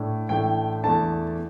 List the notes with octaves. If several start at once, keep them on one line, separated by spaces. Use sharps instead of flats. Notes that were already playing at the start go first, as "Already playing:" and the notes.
Already playing: A2 A3 D4
A1 A2 A3 D4 G5
E2 E3 A3 D4 A5